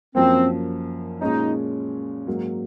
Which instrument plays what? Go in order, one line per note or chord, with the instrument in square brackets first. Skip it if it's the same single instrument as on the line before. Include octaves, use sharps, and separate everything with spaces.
[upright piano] F#2 F3 A#3 [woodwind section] C4
[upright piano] A#2 G#3 C#4 [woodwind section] D#4
[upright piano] G#2 F#3 A#3